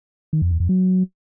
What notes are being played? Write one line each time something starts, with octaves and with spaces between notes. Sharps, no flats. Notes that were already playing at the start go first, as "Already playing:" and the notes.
D#3
F2
E2
F2
F#3